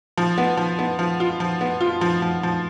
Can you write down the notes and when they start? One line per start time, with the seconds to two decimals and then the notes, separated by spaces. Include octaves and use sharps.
0.17 F3
0.38 B3
0.57 F3
0.79 B3
0.99 F3
1.20 F4
1.40 F3
1.61 B3
1.81 F4
2.01 F3
2.22 F3
2.43 F3